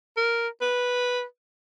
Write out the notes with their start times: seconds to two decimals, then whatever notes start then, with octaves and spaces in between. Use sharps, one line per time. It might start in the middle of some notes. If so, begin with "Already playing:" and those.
0.17 A#4
0.61 B4